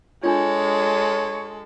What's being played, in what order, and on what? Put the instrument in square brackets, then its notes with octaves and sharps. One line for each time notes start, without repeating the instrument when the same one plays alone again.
[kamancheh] G#3 A4 [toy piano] D4 F4 [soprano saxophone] C#5